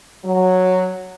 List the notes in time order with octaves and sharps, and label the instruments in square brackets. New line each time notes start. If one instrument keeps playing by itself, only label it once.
[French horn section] F#3